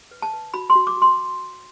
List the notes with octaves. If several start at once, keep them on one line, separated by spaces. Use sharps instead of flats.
B4
A5
B4
F#4 B5
C6
F#4
D6
F#4 C6